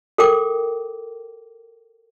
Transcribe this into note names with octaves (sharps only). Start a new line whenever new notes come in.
A4 A#4 G5 D6